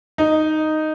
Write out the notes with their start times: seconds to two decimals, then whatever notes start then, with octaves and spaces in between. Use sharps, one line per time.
0.18 D#4